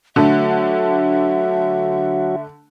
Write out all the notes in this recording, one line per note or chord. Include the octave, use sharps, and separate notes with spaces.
D3 F#3 A3 F#4 E5